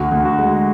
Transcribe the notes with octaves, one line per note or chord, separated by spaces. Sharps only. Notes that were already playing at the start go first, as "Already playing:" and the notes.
Already playing: D2 F#4
D2
F#4
G#3